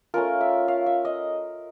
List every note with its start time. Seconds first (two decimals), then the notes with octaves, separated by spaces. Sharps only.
0.14 A3 C#4 F4 A#4
0.41 E5
0.68 F5
0.86 E5
1.05 D#5